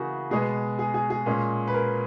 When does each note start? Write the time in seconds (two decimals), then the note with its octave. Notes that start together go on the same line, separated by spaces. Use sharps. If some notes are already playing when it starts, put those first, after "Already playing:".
Already playing: C#3 E3 A#3 F#4 G#4
0.30 B2 G#3 B3 G#4
0.79 G#4
0.94 G#4
1.10 G#4
1.26 A#2 G#3 C#4
1.68 B4
1.74 A#4